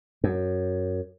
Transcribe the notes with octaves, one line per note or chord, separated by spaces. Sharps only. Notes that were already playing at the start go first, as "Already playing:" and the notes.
F#2